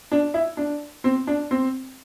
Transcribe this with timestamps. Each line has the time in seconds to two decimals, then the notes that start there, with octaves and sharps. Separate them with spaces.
0.12 D4
0.34 E4
0.57 D4
1.04 C4
1.27 D4
1.51 C4